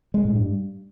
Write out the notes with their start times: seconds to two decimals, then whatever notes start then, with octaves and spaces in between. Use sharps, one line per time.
0.14 G#3
0.25 A2
0.35 G2